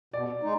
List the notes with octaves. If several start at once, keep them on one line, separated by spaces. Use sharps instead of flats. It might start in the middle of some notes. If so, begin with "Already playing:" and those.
B2 D5
G#3 D#4